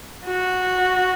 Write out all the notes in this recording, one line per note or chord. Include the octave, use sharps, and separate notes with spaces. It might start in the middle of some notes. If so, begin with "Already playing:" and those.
F#4